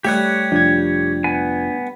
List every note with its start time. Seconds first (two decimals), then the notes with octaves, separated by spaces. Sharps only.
0.05 G3 A3 G4 C#5 F#6
0.52 F1 F3 D4 G#6
1.24 B3 G#5